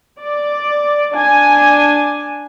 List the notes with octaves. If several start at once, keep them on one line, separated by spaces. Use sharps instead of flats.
D5
D4 G#5